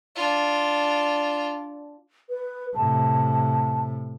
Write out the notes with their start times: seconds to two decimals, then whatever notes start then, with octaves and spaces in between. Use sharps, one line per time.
0.16 D4 F4
2.30 B4
2.75 A2 C3 A5